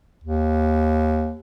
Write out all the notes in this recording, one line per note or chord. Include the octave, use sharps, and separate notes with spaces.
D#2